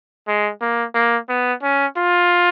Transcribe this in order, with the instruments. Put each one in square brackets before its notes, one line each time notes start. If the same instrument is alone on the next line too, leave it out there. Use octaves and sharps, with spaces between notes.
[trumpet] G#3
A#3
A#3
B3
C#4
F4